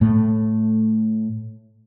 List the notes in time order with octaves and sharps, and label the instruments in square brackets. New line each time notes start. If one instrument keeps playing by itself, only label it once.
[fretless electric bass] A2 A3